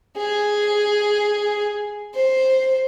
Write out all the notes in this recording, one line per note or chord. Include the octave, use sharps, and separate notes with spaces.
G#4
C5